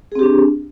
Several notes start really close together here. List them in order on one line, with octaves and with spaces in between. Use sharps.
G#4 C4 G4 D4